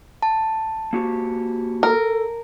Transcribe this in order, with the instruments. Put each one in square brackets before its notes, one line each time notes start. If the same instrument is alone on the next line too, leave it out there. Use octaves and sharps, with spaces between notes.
[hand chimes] A5
[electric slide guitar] A#3 F#4 G4
[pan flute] A4 [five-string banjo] A#4